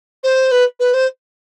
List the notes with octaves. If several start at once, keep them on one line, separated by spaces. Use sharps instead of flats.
C5
B4
B4
C5